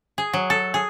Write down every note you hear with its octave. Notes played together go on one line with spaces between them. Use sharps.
G#4
F#3
A4
G#4